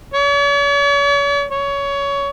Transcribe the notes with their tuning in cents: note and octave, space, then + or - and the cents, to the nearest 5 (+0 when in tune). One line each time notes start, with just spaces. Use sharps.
C#5 +45
C#5 +20